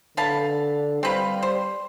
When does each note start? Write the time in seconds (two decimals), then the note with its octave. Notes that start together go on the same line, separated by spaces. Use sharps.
0.17 D3 B4 F5 A5
1.03 G3 C4 B4 F5
1.43 C5